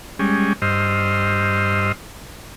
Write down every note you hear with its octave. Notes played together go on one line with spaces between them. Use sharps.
G3 G#3 C#4
G2 C5 D#5 E6 F6